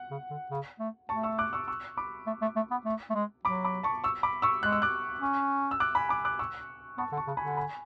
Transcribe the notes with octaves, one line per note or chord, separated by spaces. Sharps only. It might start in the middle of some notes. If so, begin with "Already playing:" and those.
Already playing: F#5
C#3
D3
C#3
A3
A3 A5 C#6
C#6 E6
D6 F#6
C#6 E6
C#6 E6
B5 D6
A3
A3
A3
B3
A3
A3
G#3
F#3 B5 D6
B5 D6
A5 C#6
C#6 E6
B5 D6
C#6 E6
G#3 F#6
E6
D6 F#6
C#4
E6
D6 F#6
G#5 B5
B5 D6
D6 F#6
C#6 E6
B3 A5 C#6
D3
A5 C#6
C#3
G#5 B5
D3
G#5 B5